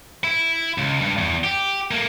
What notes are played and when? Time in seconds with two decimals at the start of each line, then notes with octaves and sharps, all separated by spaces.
0.24 E4
0.78 C#2
1.01 G2
1.18 E2
1.44 G4
1.91 A3 A#3